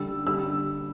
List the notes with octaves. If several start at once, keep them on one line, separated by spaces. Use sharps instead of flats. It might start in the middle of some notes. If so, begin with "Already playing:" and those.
Already playing: D3 G3 E6
D3 G3 E6